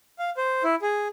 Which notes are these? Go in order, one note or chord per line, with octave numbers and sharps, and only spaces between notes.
F5
C5
E4
G#4